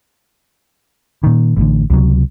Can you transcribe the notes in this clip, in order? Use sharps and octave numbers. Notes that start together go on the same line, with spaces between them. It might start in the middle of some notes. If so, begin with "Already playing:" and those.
A#2 D#3
A1 A2 D3
C#2 C3 F#3